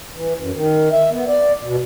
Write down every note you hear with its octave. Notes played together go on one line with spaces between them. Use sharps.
E3
F#2
D#3
E5
B3
D5
B2